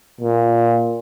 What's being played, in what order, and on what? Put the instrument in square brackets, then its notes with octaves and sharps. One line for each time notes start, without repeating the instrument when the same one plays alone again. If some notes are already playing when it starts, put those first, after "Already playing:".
[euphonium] A#2